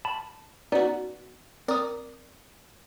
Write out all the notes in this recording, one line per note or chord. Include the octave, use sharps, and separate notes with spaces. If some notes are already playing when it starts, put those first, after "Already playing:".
A5 B5
B3 C#4 D#4 F#4 D5
C4 A#4 D5 D#6